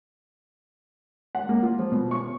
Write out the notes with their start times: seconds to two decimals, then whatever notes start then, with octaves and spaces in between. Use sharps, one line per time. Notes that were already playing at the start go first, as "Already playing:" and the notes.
1.35 F#5
1.49 A#3
1.63 F4
1.79 F3
1.92 B2
2.11 C#6